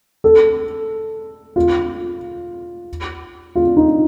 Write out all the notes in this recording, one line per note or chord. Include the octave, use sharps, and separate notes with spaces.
A4
F4
F4
D#4